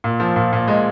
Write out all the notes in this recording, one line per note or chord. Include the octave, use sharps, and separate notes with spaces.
A#2
F3
A#2
A#2
G#3